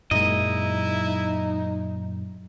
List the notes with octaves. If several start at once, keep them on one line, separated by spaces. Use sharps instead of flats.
F#2 A#2 G#3 D#4 E4 D#5